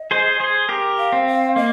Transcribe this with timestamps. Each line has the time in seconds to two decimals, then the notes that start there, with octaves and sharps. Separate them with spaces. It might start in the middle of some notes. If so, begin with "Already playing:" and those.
Already playing: D#5
0.11 G#4 C5
0.40 G#4 C5
0.69 G4 A#4
0.99 F5
1.12 C4
1.27 F5
1.56 A#3 D#5